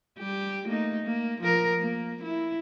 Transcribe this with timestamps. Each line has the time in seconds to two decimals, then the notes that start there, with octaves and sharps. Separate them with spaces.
0.18 G3 G4
0.66 A3 A#3 D#4
1.04 A#3
1.41 F3 A#4
1.80 A#3
2.23 E4